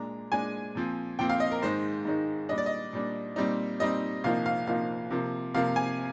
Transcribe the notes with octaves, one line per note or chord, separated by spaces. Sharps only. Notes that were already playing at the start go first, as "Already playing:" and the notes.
Already playing: A#2 G#3 D4 A#5
A#2 G#3 D4 G#5
A#2 F3 C4
A#2 F3 C4 G5
F5
D#5
A#4
G#2 D#3 G#3 D#4 C5
G#2 D#3 G#3 D#4
A#2 G3 D4 D#5
D5
D#5
A#2 G3 D4
A#2 G3 C4 D#4
A#2 G3 C4 D#4 D#5
C2 A#2 F3 A#3 D#4 F5
F5
C2 A#2 F3 A#3 D#4 F5
C3 F3 A#3
C3 F3 A#3 F5
G#5